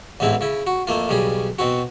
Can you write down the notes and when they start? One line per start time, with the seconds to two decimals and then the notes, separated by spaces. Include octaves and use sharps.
0.20 A1 E2 G#2 C4 E4
0.41 C#3 E4
0.67 F#4
0.87 F2 A3 A#3 F4
1.09 B1 C#3 G3 G#4
1.59 B2 C4 F#4